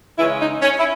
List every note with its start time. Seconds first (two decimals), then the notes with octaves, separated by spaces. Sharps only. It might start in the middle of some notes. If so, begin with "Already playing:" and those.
0.18 C#3 E3 G#3 C#4 E4
0.40 D#4
0.62 C#4
0.79 E4